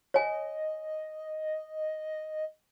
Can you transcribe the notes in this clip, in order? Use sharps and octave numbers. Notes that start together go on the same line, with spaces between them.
C#5 D#5 G#5